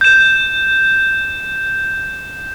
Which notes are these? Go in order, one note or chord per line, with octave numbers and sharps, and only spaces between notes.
G6 E7